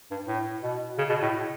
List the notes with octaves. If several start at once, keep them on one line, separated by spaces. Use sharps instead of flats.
G2
A2
B2
C#3
B2
A2